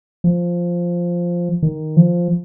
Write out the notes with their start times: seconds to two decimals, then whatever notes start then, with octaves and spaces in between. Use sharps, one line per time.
0.24 F3
1.63 D#3
1.97 F3